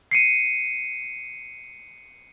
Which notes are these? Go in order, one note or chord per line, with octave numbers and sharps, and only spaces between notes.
C7 C#7 D#7